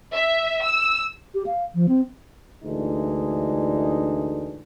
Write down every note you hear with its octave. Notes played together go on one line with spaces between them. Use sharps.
E5
E6
G4
F5
F3
C4
D2 A2 E3 G#3 D4 D#4